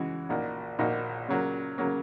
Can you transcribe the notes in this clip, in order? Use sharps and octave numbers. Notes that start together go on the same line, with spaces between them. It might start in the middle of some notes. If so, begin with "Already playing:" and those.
Already playing: C#3 E3 G#3 F#4
A#1 A#2 A#3 D#4 F#4
A#1 A#2 A#3 D#4 F#4
C#3 F#3 A#3
C#3 F#3 A#3